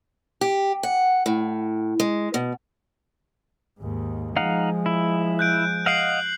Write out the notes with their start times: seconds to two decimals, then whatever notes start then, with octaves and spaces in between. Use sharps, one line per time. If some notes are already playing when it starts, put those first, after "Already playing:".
0.41 G4
0.83 F#5
1.26 A2
2.00 G#3
2.34 B2
3.79 D#2 G#2
4.36 F3 G#3 D#4 F5 F#5
4.86 E4
5.39 F#6 G6 D7
5.86 D#5 F5 F#5 C7 D7 F#7